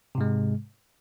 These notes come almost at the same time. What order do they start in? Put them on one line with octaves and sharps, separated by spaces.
C3 G#2 G#3